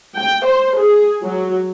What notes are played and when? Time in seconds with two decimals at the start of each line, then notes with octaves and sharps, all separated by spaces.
0.16 G5
0.45 C5
0.77 G#4
1.24 F#3